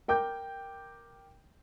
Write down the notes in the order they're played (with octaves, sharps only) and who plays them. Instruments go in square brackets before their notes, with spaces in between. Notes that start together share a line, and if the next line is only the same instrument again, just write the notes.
[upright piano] A#4 G5 D6 G6